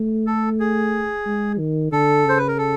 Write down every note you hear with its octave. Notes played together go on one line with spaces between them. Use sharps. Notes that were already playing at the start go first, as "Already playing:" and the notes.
Already playing: A3
A4
G#4
G#3
D#3
D3 A4
C#3 C5
B4
A#4
A4